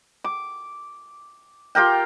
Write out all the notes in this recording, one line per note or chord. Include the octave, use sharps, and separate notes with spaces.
D6
F4 G4 A#4 G5